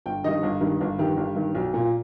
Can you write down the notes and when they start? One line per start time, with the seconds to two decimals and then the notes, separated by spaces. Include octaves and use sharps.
0.06 G1 G5
0.24 G2 D#3 D#5
0.43 G1
0.61 G2 D#3
0.81 G1
0.99 G2 D#3 G4
1.17 G1
1.36 G2 D#3
1.55 B1
1.74 A#2